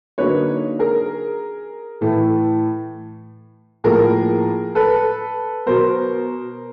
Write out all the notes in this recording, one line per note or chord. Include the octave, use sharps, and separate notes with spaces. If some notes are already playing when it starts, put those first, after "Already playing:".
D3 F#3 A#3 D#4 B4 C#5
G#4 A#4
A2 E3 A3
A2 F3 A#3 G#4 A#4
A4 B4
B2 F#3 B3 A#4 C5